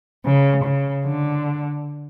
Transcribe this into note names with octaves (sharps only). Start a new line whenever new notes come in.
C#3
C#3
D3